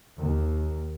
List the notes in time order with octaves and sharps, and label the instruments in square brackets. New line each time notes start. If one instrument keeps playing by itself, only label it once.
[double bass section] D#2